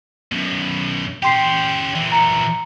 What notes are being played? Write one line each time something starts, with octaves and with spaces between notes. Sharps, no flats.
F#2 B2
C#4 G4 G5 C6 C7
A#2 E3
A#5 C#7